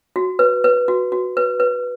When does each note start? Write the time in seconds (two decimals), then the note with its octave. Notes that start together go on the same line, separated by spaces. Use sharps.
0.16 F#4
0.39 B4
0.64 B4
0.88 F#4
1.12 F#4
1.37 B4
1.60 B4